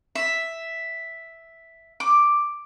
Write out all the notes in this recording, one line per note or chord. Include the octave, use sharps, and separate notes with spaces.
E5
D6